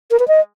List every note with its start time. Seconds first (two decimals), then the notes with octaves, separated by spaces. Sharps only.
0.11 A#4
0.20 B4
0.28 D#5